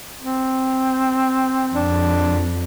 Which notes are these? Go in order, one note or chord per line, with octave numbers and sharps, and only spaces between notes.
C4
F2 D4